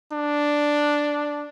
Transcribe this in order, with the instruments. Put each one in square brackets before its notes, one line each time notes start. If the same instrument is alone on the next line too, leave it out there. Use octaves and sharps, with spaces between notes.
[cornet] D4